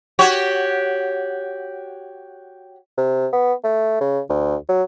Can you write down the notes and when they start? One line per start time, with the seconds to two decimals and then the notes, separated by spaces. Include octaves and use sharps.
0.19 F#4 G4 C#5
2.98 C3
3.33 B3
3.64 A3
4.01 C#3
4.29 D2
4.69 F#3